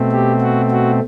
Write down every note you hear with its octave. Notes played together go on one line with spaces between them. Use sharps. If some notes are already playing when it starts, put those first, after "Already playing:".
Already playing: B2 A3 C4
G4
F#4
F#4